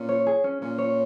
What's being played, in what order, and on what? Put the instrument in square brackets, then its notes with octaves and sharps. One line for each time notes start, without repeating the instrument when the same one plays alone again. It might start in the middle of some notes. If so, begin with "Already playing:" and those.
Already playing: [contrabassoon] A#2 [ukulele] C#4
[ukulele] C#5
G#4
C#4
[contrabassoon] A#2 [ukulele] C#4
[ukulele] C#5